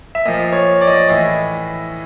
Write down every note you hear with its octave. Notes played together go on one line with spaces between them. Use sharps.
E5
A#2 F3 D#5
C#5
D5
D#5
D5
A2 E3 D#5